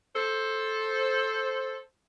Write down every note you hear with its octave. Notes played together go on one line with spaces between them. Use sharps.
A4 C5